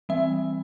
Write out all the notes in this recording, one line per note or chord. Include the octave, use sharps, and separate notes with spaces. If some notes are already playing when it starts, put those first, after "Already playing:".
E3 G3 C4 E5